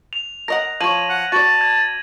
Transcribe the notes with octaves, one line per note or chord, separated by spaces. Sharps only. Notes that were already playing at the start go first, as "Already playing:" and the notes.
F7
A#4 D#5 F#5 A#6
F3 C#5 G#6 D#7 F#7
F#5
F#4 D5 A5
G#6